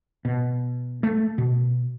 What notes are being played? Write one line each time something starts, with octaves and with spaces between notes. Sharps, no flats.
B2
A3
B2